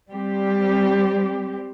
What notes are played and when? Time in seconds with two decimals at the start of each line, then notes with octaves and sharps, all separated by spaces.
0.10 G3 C4 G4